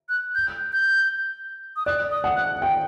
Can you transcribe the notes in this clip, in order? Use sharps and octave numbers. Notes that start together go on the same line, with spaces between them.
F#6
G6
G6
D#6
D5 F#6
D#6
F#5
F#6
G5